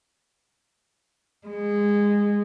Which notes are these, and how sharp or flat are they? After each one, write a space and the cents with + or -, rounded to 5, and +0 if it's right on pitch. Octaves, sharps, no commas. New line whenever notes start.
G#3 -20